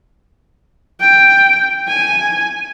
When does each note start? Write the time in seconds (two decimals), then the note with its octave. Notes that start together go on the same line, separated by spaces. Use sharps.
1.01 G5
1.88 G#5